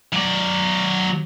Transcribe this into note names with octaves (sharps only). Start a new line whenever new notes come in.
F#3 D5